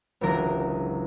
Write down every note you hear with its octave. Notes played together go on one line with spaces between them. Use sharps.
E1 C#2 F#3 D4 A#4